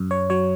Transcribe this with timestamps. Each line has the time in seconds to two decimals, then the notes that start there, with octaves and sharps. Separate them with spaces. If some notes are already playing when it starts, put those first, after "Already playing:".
Already playing: F#2
0.11 C#5
0.30 F#3 C#5